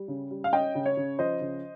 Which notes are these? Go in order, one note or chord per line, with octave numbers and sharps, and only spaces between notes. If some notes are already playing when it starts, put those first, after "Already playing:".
Already playing: G3
C#3
G3
F5
C#4 D#5 G5
C#3
C#5
C#3
F3 C5 D#5
C#3